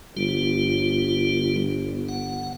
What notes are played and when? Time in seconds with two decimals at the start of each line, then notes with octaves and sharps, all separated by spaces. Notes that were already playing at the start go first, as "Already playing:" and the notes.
0.17 G1 G3 F4
2.09 F#5